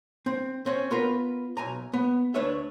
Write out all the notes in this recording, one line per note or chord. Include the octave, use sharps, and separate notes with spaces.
C4
C4 C#4
B3 F4 A#4 B4
B1 G#5 A#5
B3
D2 D4 B4 C#5 E5